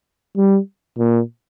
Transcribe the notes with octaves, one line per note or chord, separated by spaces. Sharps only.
G3
A#2